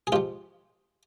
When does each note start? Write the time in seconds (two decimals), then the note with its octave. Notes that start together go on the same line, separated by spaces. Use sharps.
0.07 G#4
0.12 G#2 F3 F4 G4